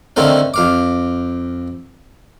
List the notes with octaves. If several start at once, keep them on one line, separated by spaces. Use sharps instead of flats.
D3 D#3 A3 C4 C#4 F5
F2 F5 D6